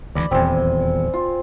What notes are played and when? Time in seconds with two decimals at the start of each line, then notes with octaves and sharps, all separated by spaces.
0.15 D2 C3 E3 D5 B5
0.31 D#1 E2 C4 G#5
1.14 F4